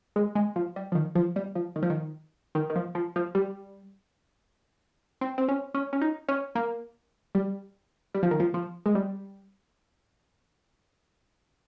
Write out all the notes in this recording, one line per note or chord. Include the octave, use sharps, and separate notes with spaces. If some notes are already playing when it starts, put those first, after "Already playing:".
G#3
G#3
F3
G3
F3
D#3
F3
G3
F3
D#3
F3
D#3
D#3
D#3
F3
F3
F3
G3
C4
C4
C#4
C#4
C#4
D#4
C#4
A#3
G3
G3
F3
D#3
F3
F3
G#3
G3